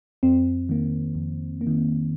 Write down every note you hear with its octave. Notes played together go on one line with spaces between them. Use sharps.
F2 C4
D#3 A#3
F2
A#3
D#3